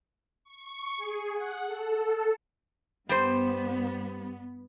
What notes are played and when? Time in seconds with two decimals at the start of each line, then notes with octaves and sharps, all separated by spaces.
0.44 C#6
0.97 G#4
1.34 F#5
1.65 A4
3.09 G2 G3 B3 C5